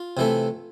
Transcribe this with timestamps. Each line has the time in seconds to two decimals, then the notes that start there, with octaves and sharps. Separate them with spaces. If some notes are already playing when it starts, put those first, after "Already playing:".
Already playing: F4
0.17 C3 E3 A3